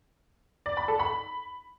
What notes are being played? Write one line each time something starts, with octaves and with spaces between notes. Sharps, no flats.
D5
B5
A4
B5